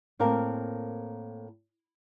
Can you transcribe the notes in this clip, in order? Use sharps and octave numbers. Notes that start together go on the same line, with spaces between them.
A2 A#3 C4 A#4 F5 A5